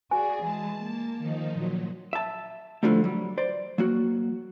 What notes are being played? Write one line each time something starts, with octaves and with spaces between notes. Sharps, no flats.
F#4 G#4 D5 G#5
E3 G#3 A5
A#3
D#3 F3 D#4
A#2 F#3
E5 A5
A2 D3 F3 G3 A3
F#3 G3
C5 D5
F#3 A#3 F#4